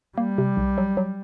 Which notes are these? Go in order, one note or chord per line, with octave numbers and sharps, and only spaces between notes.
G3 A#3
C3
B1
F#3
F#3